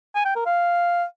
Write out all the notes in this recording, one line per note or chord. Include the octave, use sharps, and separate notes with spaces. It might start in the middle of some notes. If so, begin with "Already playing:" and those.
G#5
G5
A#4
F5